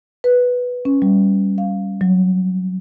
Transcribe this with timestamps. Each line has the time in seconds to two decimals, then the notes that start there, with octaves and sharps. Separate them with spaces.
0.24 B4
0.85 C#4
1.02 G3
1.58 F5
2.01 F#3